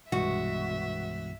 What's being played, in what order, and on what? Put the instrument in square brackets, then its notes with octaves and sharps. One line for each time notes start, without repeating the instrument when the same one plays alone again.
[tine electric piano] C2 G2 [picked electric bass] B2 E3 G#3 [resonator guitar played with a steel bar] F#4 [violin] E5